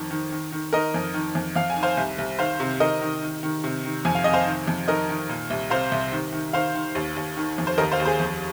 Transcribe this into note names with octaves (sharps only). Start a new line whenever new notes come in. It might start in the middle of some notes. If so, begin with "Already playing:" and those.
Already playing: F2 D#3
D#3
D#3
D#3
D#3 A#4 D#5
F2
D#3
F2
F2 F5
G#5
D#3
C5 F5
C2
C2
D#3 C5 F5
C3
D#3 A#4 D#5
D#3
D#3
D#3
C3
D#3
F2 G#5
F5
C3 D#5
C5 F5
D#3
F2
D#3 A#4 D#5
D#3
A#2
C2
C3 C5 F5
C2
D#3
D#3
D#3 C5 F5
D#3
D#2
D#2
D#3
F2
C5
D#2 A#4 D#5
C5 F5
D#2
G#4 C5
F2